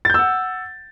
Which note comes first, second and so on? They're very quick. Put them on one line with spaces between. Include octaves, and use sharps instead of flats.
A6 G6 E6 F#5